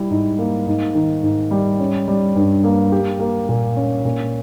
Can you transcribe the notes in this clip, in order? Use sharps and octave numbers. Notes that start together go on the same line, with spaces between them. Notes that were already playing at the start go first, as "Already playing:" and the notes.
Already playing: G3 E4
G#2
A#3
G#2
D#3
G#2
G3
C#4
G3
G2
A#3
G4
A#3
A#2
C#4
A#2